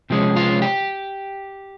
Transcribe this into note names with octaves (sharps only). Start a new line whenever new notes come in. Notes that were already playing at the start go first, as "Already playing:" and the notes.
C3 F3 G#3 C#4
F4
G4